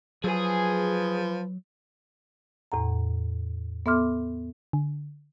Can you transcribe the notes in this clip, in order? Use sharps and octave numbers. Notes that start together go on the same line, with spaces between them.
F3 F#3 G#4 B4 G#5
E2 A2 F#5 A#5
B3 A4 E5 C6 D6 F6
D3